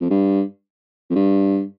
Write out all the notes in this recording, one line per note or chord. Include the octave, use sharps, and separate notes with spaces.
F2
G2
F2
G2